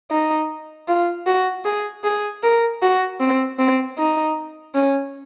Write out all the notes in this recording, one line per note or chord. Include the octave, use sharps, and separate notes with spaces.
D#4
F4
F#4
G#4
G#4
A#4
F#4
C4
C4
D#4
C#4